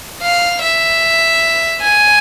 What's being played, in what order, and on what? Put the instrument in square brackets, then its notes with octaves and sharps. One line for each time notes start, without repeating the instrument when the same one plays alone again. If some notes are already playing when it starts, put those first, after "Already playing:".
[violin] F5
E5
G#5